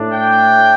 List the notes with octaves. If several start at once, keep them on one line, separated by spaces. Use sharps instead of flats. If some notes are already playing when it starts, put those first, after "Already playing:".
Already playing: A2 A3 D4
G5